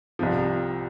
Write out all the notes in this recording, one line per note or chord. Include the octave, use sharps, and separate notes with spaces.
C2 C3 F3